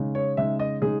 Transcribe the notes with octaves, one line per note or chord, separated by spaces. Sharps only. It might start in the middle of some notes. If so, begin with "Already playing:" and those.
Already playing: C#3 G#3 D#4
C#5
C#3 G#3 D#4 E5
D#5
C#3 G#3 D#4 G#4